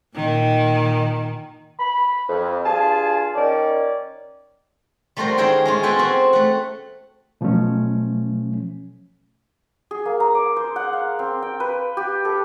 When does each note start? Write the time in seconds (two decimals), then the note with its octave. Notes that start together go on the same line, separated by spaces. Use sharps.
0.15 A#2 D#3
1.79 B5
2.29 F2
2.65 G2 F4 G#4 A5
3.35 D#3 C#4 D5
5.17 G3 A3 F4 F#4 A#4 C5
5.38 D#3 C#4 E4 G#4 G5 C6
5.65 G#3 C#4 F4
5.83 B3 F#4 A4 B4 G5 G#5
5.99 C4 F#4
6.33 A3 F#5
7.41 B2 F3 F#3 A3 C#4
9.91 G#4
10.05 A#3
10.20 A#5
10.35 D6
10.56 C5
10.76 F#5
10.93 F5
11.19 C4
11.42 G5
11.60 B4
11.97 G4
12.25 A4